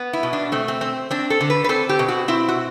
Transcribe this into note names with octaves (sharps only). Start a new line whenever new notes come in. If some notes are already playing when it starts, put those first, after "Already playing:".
Already playing: B3
E4
B2
D4
A3 C4
C4
C4
C4 D4
A4
D3
B4
B4
C4 A4
G4
B2
F#4
C4 E4
F#4